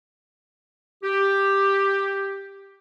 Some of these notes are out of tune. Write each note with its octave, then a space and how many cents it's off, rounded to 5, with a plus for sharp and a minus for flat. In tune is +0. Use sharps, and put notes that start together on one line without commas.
G4 +5